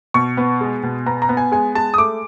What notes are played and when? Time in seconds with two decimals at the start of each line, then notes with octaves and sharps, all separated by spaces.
0.14 B2 C#6
0.37 B3
0.61 G#3
0.83 B2
1.06 B3 A#5
1.22 A#5
1.29 B3
1.37 G#5
1.52 G#3 G#5
1.75 G#3 A5
1.94 D#6
1.98 A3 D6